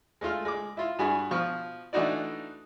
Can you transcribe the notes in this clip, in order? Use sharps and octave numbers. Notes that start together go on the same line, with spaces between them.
G#3 A3 F4 F6
G#3 D6
E4 F4
G2 F#4 G#4 G#5 B5
B2 F3 C#6 F6
E3 A3 D4 D#4 F#4 D5